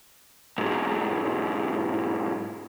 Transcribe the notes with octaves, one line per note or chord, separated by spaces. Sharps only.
B1 G#2